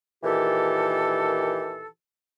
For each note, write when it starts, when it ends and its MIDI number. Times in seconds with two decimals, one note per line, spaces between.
0.24 1.87 46
0.24 1.87 51
0.24 1.87 52
0.24 1.87 67
0.24 1.87 69